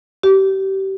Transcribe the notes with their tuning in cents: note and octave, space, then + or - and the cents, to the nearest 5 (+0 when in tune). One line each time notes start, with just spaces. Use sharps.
G4 -30